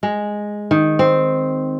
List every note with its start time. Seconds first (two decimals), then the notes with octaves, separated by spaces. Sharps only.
0.03 G#3
0.71 D#3
0.99 C4